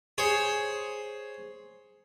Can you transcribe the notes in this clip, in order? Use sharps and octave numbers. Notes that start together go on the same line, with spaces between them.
G#4 C5 C#5